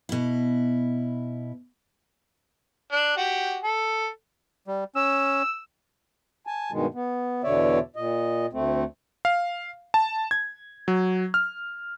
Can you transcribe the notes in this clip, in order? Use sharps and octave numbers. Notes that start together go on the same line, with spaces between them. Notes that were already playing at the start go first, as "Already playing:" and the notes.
B2 E4
D4
F#4 G4
A4
G3
C#4 E6
G#5 A5
G2 B2 D#3 G#3
B3
E2 B2 D3 C#5 D5 E5
A#2 D#5
D2 A3 C4
F5
A5
G#6
F#3
F6